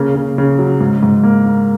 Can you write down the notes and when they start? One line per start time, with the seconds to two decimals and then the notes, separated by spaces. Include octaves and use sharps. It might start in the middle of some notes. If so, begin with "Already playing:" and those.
Already playing: C#3 A#3
0.16 C#3
0.38 C#3
0.59 F#3
0.81 G#2
1.03 G#2
1.23 A#3
1.46 A#3